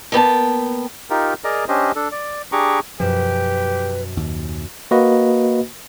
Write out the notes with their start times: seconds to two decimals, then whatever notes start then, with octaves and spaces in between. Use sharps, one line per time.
0.12 A#3 B3 G5 A5
1.10 D#4 F4 G4 A#4
1.44 G#4 A#4 D5 D#5 A#5
1.68 C#4 D4 G4 C5 D#5
1.96 D4 A4
2.12 D5
2.52 D4 G4 G#4 A#5 C#6 D6
3.00 F#2 B2 F3 G4 B4 E7
4.17 D#2
4.91 A#3 F#4 B4 D#5